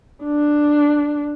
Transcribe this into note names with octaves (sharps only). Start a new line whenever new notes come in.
D4